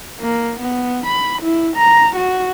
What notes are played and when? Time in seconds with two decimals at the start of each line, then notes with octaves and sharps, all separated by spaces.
0.20 A#3
0.60 B3
1.07 B5
1.42 E4
1.77 A#5
2.16 F#4